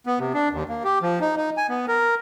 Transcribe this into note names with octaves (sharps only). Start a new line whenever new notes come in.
B3
C3
D4
D#2
A#3
G4
F3
D#4
D#4
G#5
B3
A#4